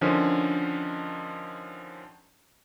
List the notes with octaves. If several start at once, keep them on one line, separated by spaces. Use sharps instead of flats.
D3 D#3 F3 C#4 D4